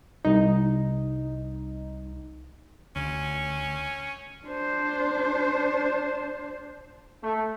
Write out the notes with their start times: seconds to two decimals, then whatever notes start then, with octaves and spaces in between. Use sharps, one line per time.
0.25 C2 D#4
2.96 D2 C#4
4.46 D4 C5
7.23 A3